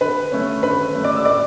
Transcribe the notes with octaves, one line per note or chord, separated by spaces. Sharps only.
D3 B4 B5
A3 C#4
D3 B4 B5
A3 C#4
D5 D6
E6
A2 D5 D6